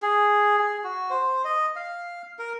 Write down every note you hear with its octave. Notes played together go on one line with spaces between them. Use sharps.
G#4
G#4
F#4
C5
D#5
F5
A#4